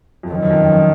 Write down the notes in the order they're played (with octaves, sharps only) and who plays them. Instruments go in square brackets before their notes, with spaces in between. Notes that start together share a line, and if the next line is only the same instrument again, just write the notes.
[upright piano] F2
[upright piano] F#2 [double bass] D#3
[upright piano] F#2
F2
F#2